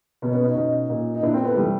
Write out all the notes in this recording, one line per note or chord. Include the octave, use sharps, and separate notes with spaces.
B2 B3 C#4
B3 C#4
C#4 D#4
B2 C#4 D#4
A#2
D#4
A#2 D4 E4
A#3 C4
A3 B3
C3 E3 G3 A3